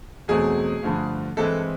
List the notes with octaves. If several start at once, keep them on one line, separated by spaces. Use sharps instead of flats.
E2 B2 F#3 A3 C4 G#4
G2 D3 F3 A3
G2 E3 G#3 C4 E4 A4